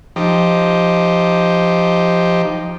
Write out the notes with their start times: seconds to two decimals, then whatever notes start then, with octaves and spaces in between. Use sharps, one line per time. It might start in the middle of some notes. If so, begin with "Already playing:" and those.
0.16 F3 D#4 G4